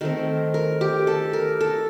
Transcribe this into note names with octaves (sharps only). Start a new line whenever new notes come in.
D#3 A3 C4 A#4
A#4
G4
A4
A#4
A4